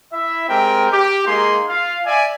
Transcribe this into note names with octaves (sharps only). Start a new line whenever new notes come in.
E4 E5
G#3 C4 G4 A#4 G5
G4
G#3 A#3 D#4 G#4 C6
F4 F5
D5 E5 G#5